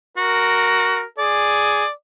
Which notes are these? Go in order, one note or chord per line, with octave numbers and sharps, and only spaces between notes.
F#4 A#4
G#4 D5